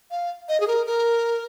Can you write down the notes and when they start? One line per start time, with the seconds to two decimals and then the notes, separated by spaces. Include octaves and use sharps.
0.11 F5
0.49 D#5
0.60 G#4
0.67 A#4
0.86 A#4